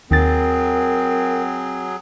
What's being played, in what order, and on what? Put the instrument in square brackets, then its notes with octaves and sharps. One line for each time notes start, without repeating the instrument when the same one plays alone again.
[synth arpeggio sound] D#2 A6 [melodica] F#3 G#4 [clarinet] C4 [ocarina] A#4